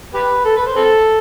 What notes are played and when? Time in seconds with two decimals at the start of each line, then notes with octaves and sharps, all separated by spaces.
0.14 G4 B4
0.45 A4
0.56 B4
0.67 C5
0.76 C4 A4